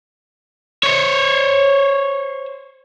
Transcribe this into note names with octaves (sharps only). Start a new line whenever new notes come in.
C5 C#5